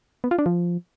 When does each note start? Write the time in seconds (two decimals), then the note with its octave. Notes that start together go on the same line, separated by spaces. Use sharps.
0.24 B3
0.31 F4
0.39 D4
0.46 F3